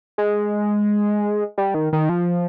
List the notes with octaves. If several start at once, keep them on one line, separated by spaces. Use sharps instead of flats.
G#3
G3
D#3
D#3
F3